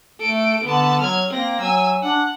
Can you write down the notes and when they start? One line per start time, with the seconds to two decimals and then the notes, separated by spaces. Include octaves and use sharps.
0.20 A3 A4 D7
0.64 D3 B3 A5
1.01 F#3 F6 G#6
1.31 A#3 C4 A#6
1.61 F#3 G#5 E6
2.03 D4 F#5